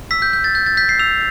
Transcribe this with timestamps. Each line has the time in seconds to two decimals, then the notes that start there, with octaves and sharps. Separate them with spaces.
0.11 E6 B6
0.22 G6
0.33 G6
0.44 A6
0.55 G6
0.66 A6
0.77 G6 B6
0.89 C7
0.99 E6 F7